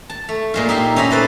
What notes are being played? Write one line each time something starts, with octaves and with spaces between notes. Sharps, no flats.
A5
A3
A#2 G#3 F4
D#4 G4 E5 C6
C#4 D#4 E5 A#5 B5
A4 B4 C5 D5